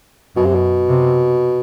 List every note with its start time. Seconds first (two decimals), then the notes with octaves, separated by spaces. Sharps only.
0.36 F#2 B2
0.45 C3
0.54 B2
0.89 C3